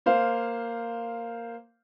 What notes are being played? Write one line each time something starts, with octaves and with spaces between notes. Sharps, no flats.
A#3 C5 F5